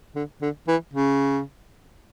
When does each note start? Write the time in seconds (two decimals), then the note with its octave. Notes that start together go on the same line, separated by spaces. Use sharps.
0.15 D3
0.42 D3
0.68 E3
0.94 C#3